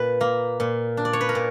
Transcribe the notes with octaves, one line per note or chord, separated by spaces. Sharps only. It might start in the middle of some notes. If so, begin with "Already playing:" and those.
Already playing: A#2 B4
A#3
A#2
D4
D5
C#5
B4
A#4
A#2